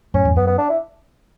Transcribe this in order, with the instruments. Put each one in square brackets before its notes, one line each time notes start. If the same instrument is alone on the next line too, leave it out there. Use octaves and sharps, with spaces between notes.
[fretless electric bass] F#2 A2 [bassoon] C#4
[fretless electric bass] E2
[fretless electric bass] F#2 [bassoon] B3
[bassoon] B3
D4
E4